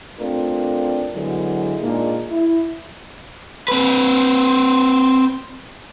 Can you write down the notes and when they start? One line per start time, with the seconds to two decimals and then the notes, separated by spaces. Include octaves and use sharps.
0.19 A3 C4 D4 F4 A#4
1.14 D3 F#3 G#3 B3 E4
1.80 A#2 G#3 A#3 D4 D#4
2.31 E4
3.68 C4 B4